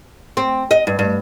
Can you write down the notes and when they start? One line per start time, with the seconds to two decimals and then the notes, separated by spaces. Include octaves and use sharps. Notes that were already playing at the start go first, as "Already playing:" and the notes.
0.37 C4
0.71 D#5
0.87 G2
0.99 G2